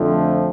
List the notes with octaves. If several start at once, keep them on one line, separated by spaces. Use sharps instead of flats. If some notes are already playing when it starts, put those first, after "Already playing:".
Already playing: F2 D3 F3 A3